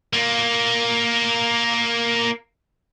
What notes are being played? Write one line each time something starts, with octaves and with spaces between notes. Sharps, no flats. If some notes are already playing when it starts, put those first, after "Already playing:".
A#3 F4